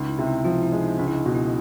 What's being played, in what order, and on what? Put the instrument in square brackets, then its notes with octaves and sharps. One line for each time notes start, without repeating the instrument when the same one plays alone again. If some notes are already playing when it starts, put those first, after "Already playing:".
Already playing: [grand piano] C#2 [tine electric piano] D#4
[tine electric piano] E4
[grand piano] C3
[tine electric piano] E4
[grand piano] F3 [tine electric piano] F4
[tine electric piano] E4
[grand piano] G#3
[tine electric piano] D#4
[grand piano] C#2 [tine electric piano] D4
[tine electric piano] E4
D#4
[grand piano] B2
[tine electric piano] E4